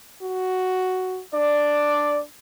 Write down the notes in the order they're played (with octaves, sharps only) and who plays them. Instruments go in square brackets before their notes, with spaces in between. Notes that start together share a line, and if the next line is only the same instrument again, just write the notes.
[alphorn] F#4
[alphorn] D4 [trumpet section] D5